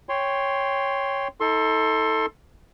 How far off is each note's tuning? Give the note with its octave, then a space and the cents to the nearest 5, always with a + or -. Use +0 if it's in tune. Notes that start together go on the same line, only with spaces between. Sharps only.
C#5 +0 G5 +10 C6 +0
D#4 +45 A4 +10 C6 +25